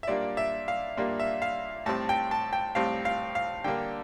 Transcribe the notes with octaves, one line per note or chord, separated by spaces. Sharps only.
E5
A#2 G3 A#3 D4 D5
E5
F5
A#2 G3 A#3 D4
E5
F5
A2 G3 C4 A5
G5
A5
G5
A2 G3 C4 F5
F5
F5
D3 G3 A#3 D4 G5